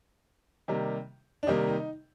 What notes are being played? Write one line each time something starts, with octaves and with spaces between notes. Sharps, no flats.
C3 D#3 G3 A#3
D4
C3 D#3 G3 A#3 D#4
D#4